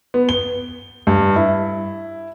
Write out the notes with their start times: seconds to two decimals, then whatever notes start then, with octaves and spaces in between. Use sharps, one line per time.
0.14 B3
0.29 G7
1.07 G2
1.36 E4